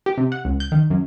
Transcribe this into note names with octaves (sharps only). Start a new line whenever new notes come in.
G4
C3
F#5
C#2
G6
D#3
F#2